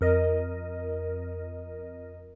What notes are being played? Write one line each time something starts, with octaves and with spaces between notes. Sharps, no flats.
F2 A#4 D#5